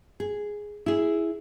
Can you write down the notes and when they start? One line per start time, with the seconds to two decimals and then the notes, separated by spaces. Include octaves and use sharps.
0.20 G#4
0.86 E4 G#4